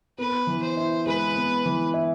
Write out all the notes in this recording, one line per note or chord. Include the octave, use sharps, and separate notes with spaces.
B3 B4
E3
C5
E4
G#3 B4
B3
E3
E4